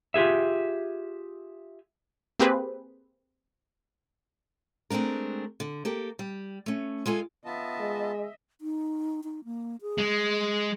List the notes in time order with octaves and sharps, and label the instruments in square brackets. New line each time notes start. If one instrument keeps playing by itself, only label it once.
[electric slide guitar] F4 G4 G#4 E5
[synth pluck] A#3 C4 G4 G#4 B4 C5
[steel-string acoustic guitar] G#3 A3 C4 D4 A#4
D3
A#3 G4 A4
G3
A3 C#4
G#3 F4 A4 G#5
[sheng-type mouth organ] B3 F4 A5 [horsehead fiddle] D#5 E5
[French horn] G#3
[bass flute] D#4
D#4
A#3
G#4
[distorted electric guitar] G#3